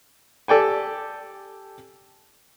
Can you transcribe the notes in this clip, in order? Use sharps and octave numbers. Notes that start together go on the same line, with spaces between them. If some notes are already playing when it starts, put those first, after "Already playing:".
G4 A4 D5 G5 G#5